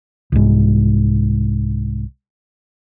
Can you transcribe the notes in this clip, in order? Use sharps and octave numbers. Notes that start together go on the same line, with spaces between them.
C2 G#2